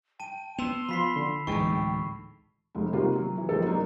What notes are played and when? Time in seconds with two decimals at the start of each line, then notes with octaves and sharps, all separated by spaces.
0.20 G5 A5 D#7
0.58 B3 C6 E6 E7 F7
0.89 F3 F4 B5 B6 C7
1.16 D3
1.47 D1 D2 E3 G#3 D#4 G5 C#6
2.75 F1 G#3
2.93 C3 D#3 G3 A#3 F4 F#4
3.15 F#3
3.38 E3
3.49 G#1 F3 A#3 D#4 A4
3.66 F#3 A#3 D4 D#4